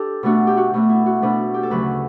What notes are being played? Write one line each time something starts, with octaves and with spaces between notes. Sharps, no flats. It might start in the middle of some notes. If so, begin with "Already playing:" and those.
Already playing: D4 G4 A4
B2 A3 D4 F#4
G4
F#4
B2 A3 D4 F#4
E4
F#4
B2 A3 D4 B4
G4
A4
D2 C#3 F#3 B4